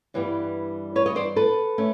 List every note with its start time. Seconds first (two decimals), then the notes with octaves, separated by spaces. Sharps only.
0.14 G2 E3 G3 B3
0.96 B4 C#5
1.06 C#5 D#5
1.16 C5 D5
1.36 A4 B4
1.78 A3 C#4